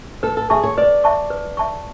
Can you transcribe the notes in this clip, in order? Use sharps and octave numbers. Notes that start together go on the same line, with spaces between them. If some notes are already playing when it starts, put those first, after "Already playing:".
A4 B4
A4
G#4 E5 A5 C#6
C#5
B4 D5
E5 A5 C#6
B4
E5 A5 C#6